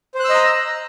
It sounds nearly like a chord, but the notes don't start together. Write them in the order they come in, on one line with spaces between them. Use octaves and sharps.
C5 F#6 E6 D#5 A#5